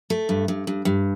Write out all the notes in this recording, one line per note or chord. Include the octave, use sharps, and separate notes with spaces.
A3
G2
G2
G2
G2